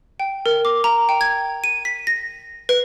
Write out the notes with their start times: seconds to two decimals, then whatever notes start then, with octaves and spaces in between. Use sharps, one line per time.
0.20 G5
0.46 A#4
0.65 D6
0.84 A#5
1.09 G5
1.21 G#6
1.64 D#7
1.85 B6
2.07 A#6
2.69 B4